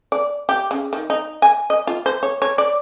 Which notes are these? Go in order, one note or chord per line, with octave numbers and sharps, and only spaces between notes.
D5
G4
C#3
D#3
D#4
G#5
D#5
F4
C5
C#5
C#5
D5